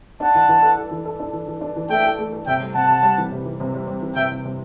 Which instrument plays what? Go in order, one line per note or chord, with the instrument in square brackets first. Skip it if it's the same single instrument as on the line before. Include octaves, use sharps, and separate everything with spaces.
[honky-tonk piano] D4 [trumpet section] F#5 A5
[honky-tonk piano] E3
E3
A4
A4
E3
A4
D4
E3
E3
D4
E3
[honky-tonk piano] A3 [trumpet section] E5 G5
[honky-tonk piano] A4
A3
A4
[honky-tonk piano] C3 [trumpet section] E5 G5
[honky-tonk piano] G3
[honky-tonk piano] C3 [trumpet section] F#5 A5
[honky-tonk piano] C3
G3
E3
C3
E3
C3
G3
G3
E3
[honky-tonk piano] C3 [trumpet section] E5 G5
[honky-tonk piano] C3
C3